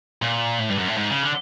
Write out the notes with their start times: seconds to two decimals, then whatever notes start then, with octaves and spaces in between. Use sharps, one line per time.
0.22 A#2
0.59 A2
0.69 G2
0.78 F#2
0.88 A2
0.97 G#2
1.10 C#3
1.23 D3